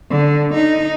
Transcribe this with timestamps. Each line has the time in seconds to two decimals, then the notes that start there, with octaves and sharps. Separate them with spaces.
0.10 D3
0.54 D#4